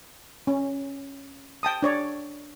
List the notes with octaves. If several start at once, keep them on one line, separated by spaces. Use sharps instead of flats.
C#4
G5 A5 D#6
D4 C#5 D5